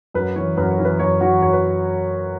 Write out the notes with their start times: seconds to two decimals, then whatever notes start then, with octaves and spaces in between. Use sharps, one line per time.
0.14 F#2 B4
0.36 E3 C#5
0.57 F#2 B4
0.71 C#5
0.79 E3
0.85 B4
0.99 F#2 C#5
1.21 E3 F#4 F#5
1.42 F#2 C#5
1.53 B4